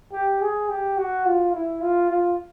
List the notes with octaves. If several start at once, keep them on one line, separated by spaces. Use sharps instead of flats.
G4
G#4
G4
F#4
F4
E4
F4
F4